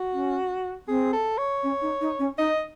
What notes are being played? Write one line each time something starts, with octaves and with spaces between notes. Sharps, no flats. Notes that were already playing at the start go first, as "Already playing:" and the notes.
Already playing: F#4
C#4
C4 G#4
A4
C#5
C#4
D#4
D#4
C#4
D#4 D#5